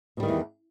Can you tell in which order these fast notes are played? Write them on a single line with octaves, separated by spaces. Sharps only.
B2 G3 D#3 E3 E2